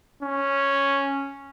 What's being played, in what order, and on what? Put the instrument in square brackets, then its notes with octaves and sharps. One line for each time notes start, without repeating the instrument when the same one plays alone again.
[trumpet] C#4